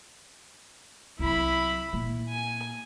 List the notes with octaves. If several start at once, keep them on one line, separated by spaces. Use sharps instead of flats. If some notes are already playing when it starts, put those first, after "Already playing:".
C2 F#3 E4 B5
A#2 A#3
G#5